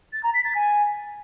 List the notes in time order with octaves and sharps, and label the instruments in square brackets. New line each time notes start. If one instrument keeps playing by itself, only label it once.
[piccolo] A6
A#5
B6
A6
G#5